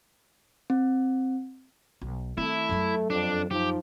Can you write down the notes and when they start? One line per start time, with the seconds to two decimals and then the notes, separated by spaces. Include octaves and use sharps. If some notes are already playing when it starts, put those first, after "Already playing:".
0.70 C4
2.02 B1
2.38 D#3 A3 C4 E4 A4
2.69 F#2 F#3
3.10 F2 D4
3.51 F3 D#4 G4